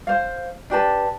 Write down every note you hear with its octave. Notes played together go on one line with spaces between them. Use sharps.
C5 F5
D4 G4 B4 A5